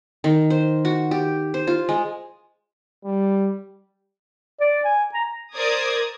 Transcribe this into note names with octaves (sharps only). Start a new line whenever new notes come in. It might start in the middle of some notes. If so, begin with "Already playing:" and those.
D#3
C5
F#4
G4
C5
F4
G#3
G3
D5
G#5
A#5
A#4 C5 D5 D#6 G#6